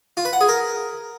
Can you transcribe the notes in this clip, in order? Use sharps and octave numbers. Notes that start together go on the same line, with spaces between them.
F4
B4
F#5
G#4
A#4